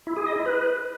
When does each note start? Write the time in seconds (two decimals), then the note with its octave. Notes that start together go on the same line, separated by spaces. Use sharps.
0.07 E4
0.17 G#4
0.26 D#5
0.36 E4
0.46 B4